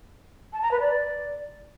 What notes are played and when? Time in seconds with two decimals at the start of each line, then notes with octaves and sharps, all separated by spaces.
0.53 A5
0.62 A#5
0.71 B4
0.81 D5